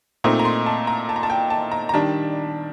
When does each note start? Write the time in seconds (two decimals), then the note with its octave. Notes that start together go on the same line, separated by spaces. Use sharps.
0.24 A#2 A3 C4 D#4 A#5
0.39 A#5
0.45 C6
0.66 A5
0.87 A#5
1.09 A5
1.16 A#5
1.23 A5
1.30 G5
1.50 A5
1.72 A#5
1.89 A#5
1.93 D#3 G3 D4 A5